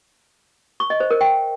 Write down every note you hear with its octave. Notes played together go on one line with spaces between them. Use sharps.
C#6
D#5
C5
A#4
G5